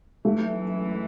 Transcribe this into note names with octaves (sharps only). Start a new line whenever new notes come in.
F#2 E3 G#3 A3